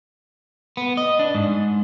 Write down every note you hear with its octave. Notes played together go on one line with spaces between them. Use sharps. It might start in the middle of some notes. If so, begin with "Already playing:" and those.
B3
D#5
D4
G#2